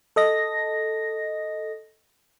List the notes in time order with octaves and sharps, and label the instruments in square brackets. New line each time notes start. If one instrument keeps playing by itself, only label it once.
[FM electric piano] A4 D#5 A#6